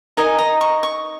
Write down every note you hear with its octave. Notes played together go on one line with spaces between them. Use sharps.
D#4 A#4 D#5 G#5
A#5
C#6
C#6